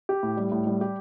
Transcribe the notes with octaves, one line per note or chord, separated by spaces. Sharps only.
G4
A2
G3
A2
G3
G4